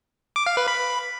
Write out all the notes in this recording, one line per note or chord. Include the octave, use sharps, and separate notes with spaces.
D6
F5
B4
B5